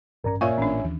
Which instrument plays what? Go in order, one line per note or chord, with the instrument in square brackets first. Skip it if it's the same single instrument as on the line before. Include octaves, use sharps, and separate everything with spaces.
[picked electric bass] A1 G2 C#4 [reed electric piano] A#4 D5 A#5
[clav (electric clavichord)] A#2 [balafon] F4 F5 C#6 [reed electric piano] C#5 E5 G#5
[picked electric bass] A1 [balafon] C#4 D4
[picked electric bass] D#2 E3